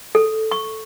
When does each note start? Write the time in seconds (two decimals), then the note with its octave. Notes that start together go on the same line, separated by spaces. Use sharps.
0.15 A4
0.51 C#6